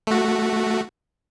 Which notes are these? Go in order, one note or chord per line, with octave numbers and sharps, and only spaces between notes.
A3 F#4